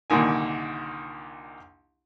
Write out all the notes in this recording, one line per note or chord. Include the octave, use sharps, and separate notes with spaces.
C2 A#2 D3 D#3 G#5